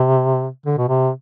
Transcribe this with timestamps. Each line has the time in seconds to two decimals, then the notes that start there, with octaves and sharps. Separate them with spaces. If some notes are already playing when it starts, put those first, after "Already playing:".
Already playing: C3
0.66 D3
0.78 B2
0.89 C3